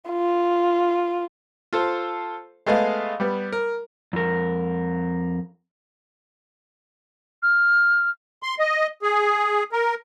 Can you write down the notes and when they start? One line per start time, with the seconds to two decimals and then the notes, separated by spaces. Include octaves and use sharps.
0.10 F4
1.73 F4 A4 C5
2.66 G#3 A3 B3 D#5 F5
3.20 G3 B3
3.52 A#4
4.13 F2 A#4
7.43 F6
8.43 C6
8.59 D#5
9.02 G#4
9.72 A#4